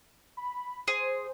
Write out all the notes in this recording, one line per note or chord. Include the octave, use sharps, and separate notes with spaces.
B5
G#4 C5